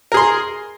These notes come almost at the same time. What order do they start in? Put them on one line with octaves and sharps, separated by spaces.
A#4 G#4 C6